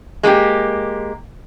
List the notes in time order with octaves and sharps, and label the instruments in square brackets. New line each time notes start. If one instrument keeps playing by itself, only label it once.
[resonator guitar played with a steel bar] G#3 A#3 D4 G4